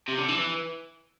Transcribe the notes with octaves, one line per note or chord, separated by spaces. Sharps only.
C3
D3
E3
E3